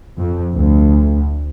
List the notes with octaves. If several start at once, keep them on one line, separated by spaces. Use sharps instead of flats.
F2
D2